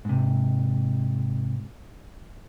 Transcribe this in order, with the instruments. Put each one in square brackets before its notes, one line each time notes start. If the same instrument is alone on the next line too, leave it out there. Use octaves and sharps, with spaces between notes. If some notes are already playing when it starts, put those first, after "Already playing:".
[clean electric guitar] G#2 C3